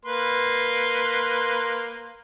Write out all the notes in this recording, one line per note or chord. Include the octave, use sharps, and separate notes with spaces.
A#3 B4 C6